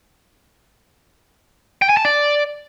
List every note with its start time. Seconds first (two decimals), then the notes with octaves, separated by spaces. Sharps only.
1.82 G5
1.89 G#5
1.97 A5
2.05 D5